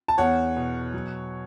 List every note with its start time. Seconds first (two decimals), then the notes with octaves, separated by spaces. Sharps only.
0.08 A5
0.18 E2 C#5 F#5
0.56 B2
0.94 F#3